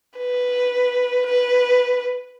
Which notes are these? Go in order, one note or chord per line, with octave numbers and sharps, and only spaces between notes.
B4
B4